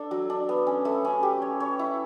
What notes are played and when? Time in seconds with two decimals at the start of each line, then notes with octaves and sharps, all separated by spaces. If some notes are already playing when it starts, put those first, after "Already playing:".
Already playing: D4 A4
0.11 F#3
0.30 D4
0.49 B3
0.67 C#4
0.85 A3
1.05 C#4
1.23 G4
1.42 C#5
1.60 C#5
1.79 E4